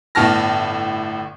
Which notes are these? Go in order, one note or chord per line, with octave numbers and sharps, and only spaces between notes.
G1 A2 A5 F6 A#6